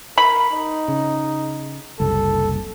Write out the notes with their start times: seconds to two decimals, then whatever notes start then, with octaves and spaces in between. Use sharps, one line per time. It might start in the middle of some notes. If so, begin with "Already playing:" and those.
0.18 A#4 B5
0.51 D#4
0.88 C#3
2.00 F#1 C2 A4